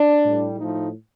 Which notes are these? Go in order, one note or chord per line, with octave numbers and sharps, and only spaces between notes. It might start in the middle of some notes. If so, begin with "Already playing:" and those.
Already playing: D4
A2 G3
A2 F3 A3 D#4